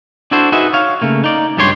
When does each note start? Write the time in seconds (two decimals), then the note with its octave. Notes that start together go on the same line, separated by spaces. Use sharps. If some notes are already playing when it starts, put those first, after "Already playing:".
0.31 D4 E4 F#4 A4 C5
0.52 D#4 F#4 G#4 B4 E5
0.73 C#5 F5
1.01 C#3 A3 A#3
1.24 D#4 D5
1.57 C#2 G2 G3 G4 C#5 C6